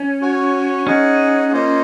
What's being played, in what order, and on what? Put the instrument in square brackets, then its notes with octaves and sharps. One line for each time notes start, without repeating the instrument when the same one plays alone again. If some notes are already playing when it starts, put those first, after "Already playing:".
Already playing: [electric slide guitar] C#4
[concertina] F#4 C#5 G#5
[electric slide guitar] C#4 [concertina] D#4 G#4 D#5 F#5
[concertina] A#3 F4 C5 D#5